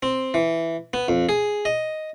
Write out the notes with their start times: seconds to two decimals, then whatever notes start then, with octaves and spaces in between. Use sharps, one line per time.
0.03 C4
0.34 E3
0.93 B3
1.08 F2
1.29 G#4
1.65 D#5